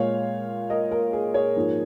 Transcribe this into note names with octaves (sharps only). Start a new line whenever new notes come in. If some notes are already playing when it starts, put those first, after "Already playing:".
Already playing: A#2 G#3 C#5 F5
A#4 D#5
A#4
G#4
G#4 C#5
G#2 F3 A#3